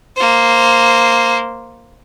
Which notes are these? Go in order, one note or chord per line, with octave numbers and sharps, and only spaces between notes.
A#3 C5